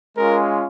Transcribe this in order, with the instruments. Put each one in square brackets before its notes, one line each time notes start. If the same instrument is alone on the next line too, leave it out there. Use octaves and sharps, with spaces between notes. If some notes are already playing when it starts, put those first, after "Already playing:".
[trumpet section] G#3 C#4 F4 A#4